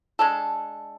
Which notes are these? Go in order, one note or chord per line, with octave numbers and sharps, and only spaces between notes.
G#3 D4 A4